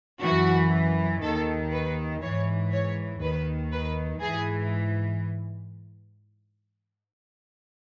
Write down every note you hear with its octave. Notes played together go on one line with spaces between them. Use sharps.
F#2 E3 F#4
D#2 D#3 A4
B4
G#2 E3 C#5
C#5
D#2 D#3 B4
B4
G#2 E3 G#4